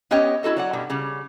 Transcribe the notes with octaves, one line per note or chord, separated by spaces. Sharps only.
B3 C#4 G4 C#5 D#5 G5
E4 F#4 A4 D#5
F#3 D5 F#5
G2 B2 G3
C#3 G3